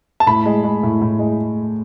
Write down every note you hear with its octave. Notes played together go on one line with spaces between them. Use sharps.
A5
A2 B5
G#3
G#3
A2
A2
G#3